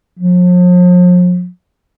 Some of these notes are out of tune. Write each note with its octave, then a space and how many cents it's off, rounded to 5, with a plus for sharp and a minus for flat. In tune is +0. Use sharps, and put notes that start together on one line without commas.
F3 +40